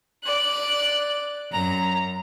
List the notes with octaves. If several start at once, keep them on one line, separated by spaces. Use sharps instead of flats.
D5 F#6
F#2 A#5